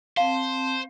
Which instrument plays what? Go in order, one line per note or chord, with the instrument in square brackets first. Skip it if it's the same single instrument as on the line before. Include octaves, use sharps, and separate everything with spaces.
[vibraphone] C4 A5 [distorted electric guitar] C5 [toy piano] F5